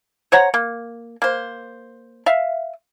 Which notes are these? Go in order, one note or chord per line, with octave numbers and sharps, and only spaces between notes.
C5 C#5 F#5 A#5
A#3
A#3 C5
E5 F5